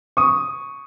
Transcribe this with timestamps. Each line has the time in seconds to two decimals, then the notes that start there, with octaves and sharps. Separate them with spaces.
0.17 C#6 D#6